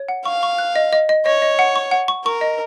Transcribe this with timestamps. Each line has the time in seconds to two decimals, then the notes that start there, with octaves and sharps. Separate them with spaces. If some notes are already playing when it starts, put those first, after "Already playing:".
Already playing: C#5
0.09 F#5
0.25 F5 C#6
0.43 C#6
0.58 F#6
0.76 D#5
0.93 D#5
1.09 D#5
1.26 C#5 D#5
1.42 D#5
1.59 F#5
1.76 C#6
1.91 F#5
2.08 C#6
2.25 A#4 C#6
2.41 D#5